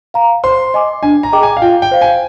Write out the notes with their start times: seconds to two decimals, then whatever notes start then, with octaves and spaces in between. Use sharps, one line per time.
0.14 F5 A#5
0.44 C5 C6
0.74 D#5 G#5 D6
1.03 D4 G#5
1.23 A#5
1.32 G#4 D#5 G5 D6
1.43 G#5
1.57 F5
1.62 F4 G5
1.82 G5
1.91 C5 F5
2.01 G#5